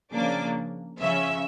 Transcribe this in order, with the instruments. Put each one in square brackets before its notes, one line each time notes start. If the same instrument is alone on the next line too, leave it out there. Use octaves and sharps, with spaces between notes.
[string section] C#3 F3 A#3 D4 D6
C#3 F3 C#4 E5